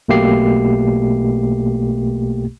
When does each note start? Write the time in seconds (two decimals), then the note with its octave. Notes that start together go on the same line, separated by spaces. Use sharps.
0.08 B1 B2 A3 A#3 G4 C7